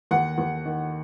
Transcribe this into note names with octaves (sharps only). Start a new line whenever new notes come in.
D#2 F#5
D#2
D#3